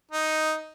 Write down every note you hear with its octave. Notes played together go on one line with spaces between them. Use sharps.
D#4